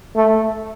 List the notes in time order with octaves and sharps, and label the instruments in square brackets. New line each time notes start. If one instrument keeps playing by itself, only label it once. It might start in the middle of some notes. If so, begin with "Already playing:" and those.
[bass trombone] A3